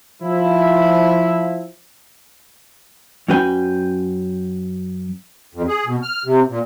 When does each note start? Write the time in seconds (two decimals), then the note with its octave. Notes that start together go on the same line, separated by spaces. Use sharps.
0.22 F3 E4
3.28 F#2 C#4 F#4 B4 G5 G#5
5.55 F2
5.68 G#4
5.86 B2
6.03 F6
6.25 C3
6.49 A#2